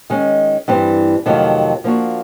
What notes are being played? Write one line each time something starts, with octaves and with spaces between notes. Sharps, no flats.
D#3 G#3 C#4
G2 E3 G3 C4
F2 C3 D#3 F#3 A3
F3 A#3 D4 F#4